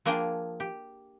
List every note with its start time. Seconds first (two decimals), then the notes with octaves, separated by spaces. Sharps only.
0.05 F3 A#3 D4 G#4 G5
0.60 G4